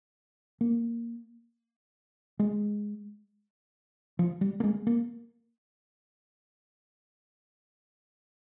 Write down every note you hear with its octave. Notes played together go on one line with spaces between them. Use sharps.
A#3
G#3
F3
G3
A#3
G#3
A#3